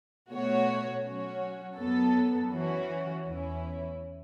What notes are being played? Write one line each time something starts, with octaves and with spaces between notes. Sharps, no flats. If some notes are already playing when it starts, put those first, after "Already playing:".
B2 A3 F#4 C#5
F#3 C#4 F#4 C#5
F#2 F#3 B3 A4
E3 C#4 F#4
E2 E3 C#4 E4